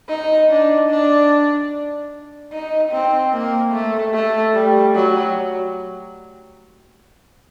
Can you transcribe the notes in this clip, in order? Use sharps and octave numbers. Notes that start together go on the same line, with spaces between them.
D#4
D4
D4
D#4
C4
A#3
A3
A3
G3
F#3